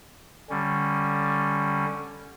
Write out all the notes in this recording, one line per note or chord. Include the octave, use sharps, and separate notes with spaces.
D3 G3 C#4